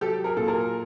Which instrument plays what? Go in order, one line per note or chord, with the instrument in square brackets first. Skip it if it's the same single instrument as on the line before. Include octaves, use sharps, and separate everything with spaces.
[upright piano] F#3 G4 A4
G#4 A#4
A#2 A4
G#4 A#4